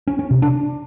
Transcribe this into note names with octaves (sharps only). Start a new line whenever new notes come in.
C#4
C#4
C3
D4